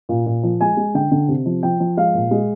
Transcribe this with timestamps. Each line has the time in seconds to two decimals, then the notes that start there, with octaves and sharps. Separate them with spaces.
0.09 A#2
0.26 A#2
0.43 F3
0.61 G#3 G#5
0.77 G#3
0.94 D3 G5
1.11 D3
1.28 C3
1.46 F3
1.63 F3 G5
1.80 F3
1.97 G#3 F5
2.14 A#2
2.31 G#3